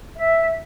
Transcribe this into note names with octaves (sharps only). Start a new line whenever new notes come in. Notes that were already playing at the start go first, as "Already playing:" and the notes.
E5